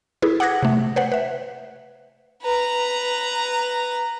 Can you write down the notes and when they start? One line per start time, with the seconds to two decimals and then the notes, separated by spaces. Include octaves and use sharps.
0.22 E4 G#4 A4 B4
0.40 F#5 D6 D#6 F#6 G#6 A#6
0.63 C3 A3
0.96 B4 C5 F#5
1.12 B4 E5
2.43 B4 A#5